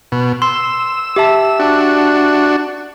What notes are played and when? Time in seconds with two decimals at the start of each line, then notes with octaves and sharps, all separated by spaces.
0.12 B2
0.42 C6 E6
1.16 G4 E5 A5
1.59 D4 F#4